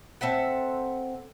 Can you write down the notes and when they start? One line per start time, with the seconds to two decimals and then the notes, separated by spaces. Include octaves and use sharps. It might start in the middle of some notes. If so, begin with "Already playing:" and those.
0.21 C4 A4 E5 F#5